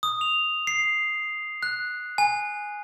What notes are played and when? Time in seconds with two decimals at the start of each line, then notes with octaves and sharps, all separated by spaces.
0.03 D#6
0.21 F7
0.67 C7
1.63 F#6
2.18 G#5